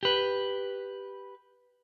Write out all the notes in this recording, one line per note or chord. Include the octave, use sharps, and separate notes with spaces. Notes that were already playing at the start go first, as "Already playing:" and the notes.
G4 B4